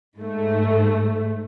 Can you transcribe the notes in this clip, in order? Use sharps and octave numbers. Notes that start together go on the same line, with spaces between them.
G#2 A3